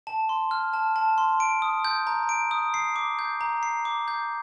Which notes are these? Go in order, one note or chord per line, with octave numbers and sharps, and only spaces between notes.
A5
C6
F6
A5
A5
C6
D7
D#6
G6
A#5
D7
D#6
C7
D6
G6
A#5
C7
D6
G6